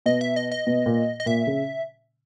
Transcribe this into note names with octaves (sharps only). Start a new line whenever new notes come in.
B2 D#5
E5
D#5
D#5
B2
A#2
D#5
A#2 E5
C#3